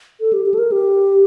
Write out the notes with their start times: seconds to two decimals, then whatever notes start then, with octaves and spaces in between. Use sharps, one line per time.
0.21 A4
0.33 G4
0.46 G4
0.54 A4
0.59 A#4
0.72 G4